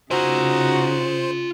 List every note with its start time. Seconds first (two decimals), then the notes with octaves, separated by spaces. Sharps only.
0.11 C#3 D#4 F4 F#4 C5 G#5